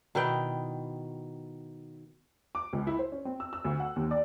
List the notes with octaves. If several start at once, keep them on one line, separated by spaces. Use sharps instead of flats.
B2 D#3 E4 G5
D6
C#2
E4
C5
C#4
C4
E6
E6
D2
F#5
D#2
D5